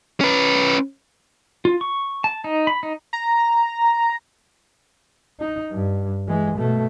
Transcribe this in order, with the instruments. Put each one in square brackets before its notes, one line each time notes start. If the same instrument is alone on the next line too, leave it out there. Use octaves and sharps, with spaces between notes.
[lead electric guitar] C#4 B4
[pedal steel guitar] F4
C#6
A5
D#4
B5
D#4
[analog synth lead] A#5
[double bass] D#4
G2
E3 G#3
B2 A3